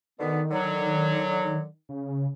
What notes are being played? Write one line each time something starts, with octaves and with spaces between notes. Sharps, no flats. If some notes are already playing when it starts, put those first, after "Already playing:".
B2 D3 D#3 B3
D3 F#3
C#3